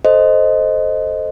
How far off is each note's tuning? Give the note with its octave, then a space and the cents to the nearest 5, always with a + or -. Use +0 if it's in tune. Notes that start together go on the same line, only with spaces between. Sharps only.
A4 +0 C5 +0 D#5 +0